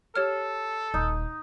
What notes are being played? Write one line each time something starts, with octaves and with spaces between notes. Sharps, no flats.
G4 A4 C#5 F6
D#1 D#4